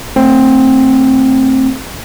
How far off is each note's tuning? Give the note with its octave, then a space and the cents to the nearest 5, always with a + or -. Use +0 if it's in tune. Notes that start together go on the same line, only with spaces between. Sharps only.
A3 +30 C4 +15